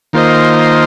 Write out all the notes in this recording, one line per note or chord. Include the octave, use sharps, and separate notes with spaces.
D#3 A#3 F4 C5 D#5